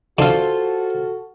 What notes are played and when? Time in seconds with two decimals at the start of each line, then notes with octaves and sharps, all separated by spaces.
0.19 D3 F4 F#4 A4 C5